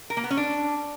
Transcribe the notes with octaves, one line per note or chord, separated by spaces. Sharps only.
A#4
A#3
B3
C#4
D4